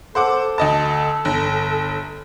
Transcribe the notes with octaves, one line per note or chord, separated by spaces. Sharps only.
A4 C5 F#5 D6
D2 D#5 A5
G1